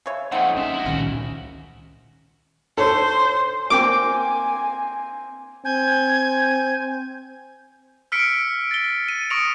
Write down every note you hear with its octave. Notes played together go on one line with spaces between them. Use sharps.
C#3 C#5 E5
F2 A#2 C#3 C4 D#4 F#5
G#3 C#4 E5
E4 F#4
C#2 A#2 D#3 C#4
A4 C5 C#5
A#3 C4 G5 G#5 D6
C4 G#5 G6 G#6
E6 F6 B6 C#7 D7
A6 G7
D#7
C#6 D#6 A#6 C#7 D7 F7